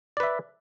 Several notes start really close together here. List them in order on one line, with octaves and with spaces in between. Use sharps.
D5 B4 E5